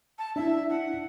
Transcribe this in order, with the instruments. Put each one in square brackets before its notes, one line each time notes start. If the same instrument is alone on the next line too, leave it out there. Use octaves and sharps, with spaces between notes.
[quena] A5
[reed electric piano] D4 E4 [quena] E5
[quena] F#5